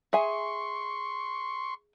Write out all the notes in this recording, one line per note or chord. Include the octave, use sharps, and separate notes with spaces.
G#4 E5 G#5 C6 C#6